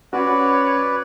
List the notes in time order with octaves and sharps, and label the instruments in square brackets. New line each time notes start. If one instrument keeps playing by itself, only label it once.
[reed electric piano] C#4 F#4 [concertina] B4 D5 [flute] C#5 [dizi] B5